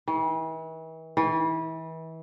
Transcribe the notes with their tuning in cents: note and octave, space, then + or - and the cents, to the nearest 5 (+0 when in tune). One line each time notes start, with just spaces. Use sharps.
E3 -40
E3 -30